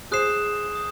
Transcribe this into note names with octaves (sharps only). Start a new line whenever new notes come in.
G#4 C5 D#6 F#6 C7 E7
D#6